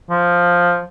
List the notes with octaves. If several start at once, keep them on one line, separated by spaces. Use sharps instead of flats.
F3